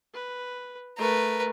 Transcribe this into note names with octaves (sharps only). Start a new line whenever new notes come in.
B4
A3 A#4 B4